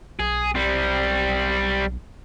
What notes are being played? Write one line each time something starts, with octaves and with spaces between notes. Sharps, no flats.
B1 G#4
G3 C4